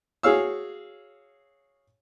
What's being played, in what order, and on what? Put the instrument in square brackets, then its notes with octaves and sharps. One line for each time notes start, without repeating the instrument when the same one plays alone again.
[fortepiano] F#4 G#4 C#5 F5 E6